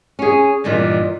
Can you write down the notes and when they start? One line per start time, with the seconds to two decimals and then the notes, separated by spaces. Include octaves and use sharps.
0.19 C#4 G#4
0.64 G2 A#2 D#3 E3